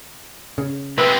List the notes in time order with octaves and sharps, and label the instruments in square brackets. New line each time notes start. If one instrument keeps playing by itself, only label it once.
[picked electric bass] C#3
[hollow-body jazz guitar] C#2 B4 B5 [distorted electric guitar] C3 G#3 [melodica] E5